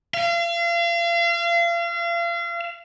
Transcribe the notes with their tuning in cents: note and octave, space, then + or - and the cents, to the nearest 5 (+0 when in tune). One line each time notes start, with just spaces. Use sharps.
F5 -35